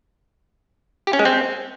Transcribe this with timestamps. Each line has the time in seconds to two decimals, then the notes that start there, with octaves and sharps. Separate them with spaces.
1.07 G4
1.13 C#4
1.19 G#3
1.25 C4